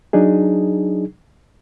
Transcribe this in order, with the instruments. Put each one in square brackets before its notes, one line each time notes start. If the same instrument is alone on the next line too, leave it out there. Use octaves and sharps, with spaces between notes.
[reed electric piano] F#3 D4 D#4 G#4